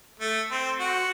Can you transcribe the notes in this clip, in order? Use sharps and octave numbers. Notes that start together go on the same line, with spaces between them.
A3
C4
F#4